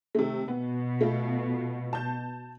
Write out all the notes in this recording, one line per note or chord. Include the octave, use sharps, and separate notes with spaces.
C3 D#3 A3
B2 B3
A3 F4
A5 G6